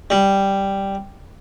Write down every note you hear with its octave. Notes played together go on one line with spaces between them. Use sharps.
G3